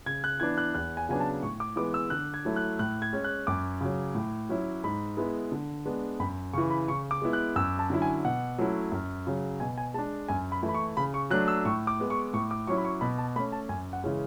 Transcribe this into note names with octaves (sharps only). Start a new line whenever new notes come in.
C#3 G#6
F#6
E3 B3 D4 G#6
F#6
E2 F#6
G#5
C#3 F#3 B3 D4 G#5
A5
A2 C#6
D6
E3 G#3 B3 E4 D6
E6
D3 F#6
G#6
F#3 A3 E4
F#6
A2 F#6
G#6
G#3 C#4
F#6
F#2 D6
C#3 F#3
A2
F#3 C#4 E4
G#2 B5
G#3 B3 E4
D3
G#3 B3 D4
F#2 B5
C#3 E3 C#6
B5
C#3 C#6
D6
G#3 B3 E4
F#6
F#2 E6
A5
D3 F#3 C#4 E4
G#5
B2 F#5
F#3 A3 C#4 E4
F#2
C#3 F#3
B2 G#5
G#5
G#3 D4 A5
F#2 G#5
B5
E3 A3 E4
B5
C#6
C#3 B5
C#6
F#3 A3 D4 F#6
E6
A2 C#6
D6
G#3 B3
C#6
A2 C#6
D6
F#3 C#4 E4 C#6
B5
C#6
B2 B5
A5
A3 C#4 B5
A5
F#2 G#5
F#5
C#3 E3 G#3 C#4